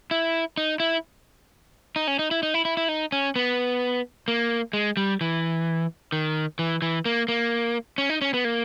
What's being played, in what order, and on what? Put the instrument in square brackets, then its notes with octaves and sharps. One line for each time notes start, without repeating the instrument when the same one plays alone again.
[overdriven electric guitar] E4
D#4
E4
D#4
C#4
D#4
E4
D#4
E4
E4
E4
D#4
C#4
B3
A#3
G#3
G3
E3
D#3
E3
E3
A#3
A#3
C#4
D#4
C#4
B3
A#3